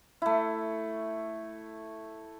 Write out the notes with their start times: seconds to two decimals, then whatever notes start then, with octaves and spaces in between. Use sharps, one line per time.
0.22 A3 E4